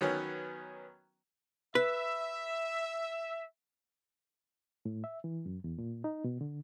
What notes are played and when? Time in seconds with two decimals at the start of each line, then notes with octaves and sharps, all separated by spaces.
0.01 D#3 F#3 B3 C#4
1.75 B4 E5
4.85 A2
5.04 E5
5.24 E3
5.46 F#2
5.64 E2
5.78 A#2
6.04 D#4
6.24 B2
6.41 D3